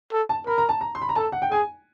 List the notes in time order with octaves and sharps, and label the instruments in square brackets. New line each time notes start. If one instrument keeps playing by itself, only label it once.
[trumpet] A4
[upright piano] A5
[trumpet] A#4 [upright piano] B5
[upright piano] A#5
A5
A#5
C6
B5
A#5
[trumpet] A4 [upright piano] A5
[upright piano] F#5
G5
[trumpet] G#4 [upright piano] G#5